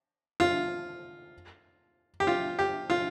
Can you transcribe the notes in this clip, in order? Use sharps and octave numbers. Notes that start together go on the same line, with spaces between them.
F4
G4
F4
G4
F4